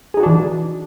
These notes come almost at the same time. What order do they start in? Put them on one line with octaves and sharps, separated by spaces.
G#4 D#4 F#4 D4 E3